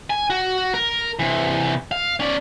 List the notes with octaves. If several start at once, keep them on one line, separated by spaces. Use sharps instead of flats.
G#5
F#4
A#4
C3 E3
F5
C#4 D5